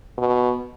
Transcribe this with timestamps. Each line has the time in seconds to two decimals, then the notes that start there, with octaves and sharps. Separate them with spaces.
0.18 B2